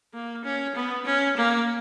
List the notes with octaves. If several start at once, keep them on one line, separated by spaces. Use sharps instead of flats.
A#3
C#4
B3
C#4
A#3